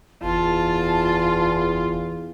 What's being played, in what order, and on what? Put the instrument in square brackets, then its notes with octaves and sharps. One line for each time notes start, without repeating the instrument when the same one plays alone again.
[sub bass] F#1 [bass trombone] E2 [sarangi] F4 [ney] A5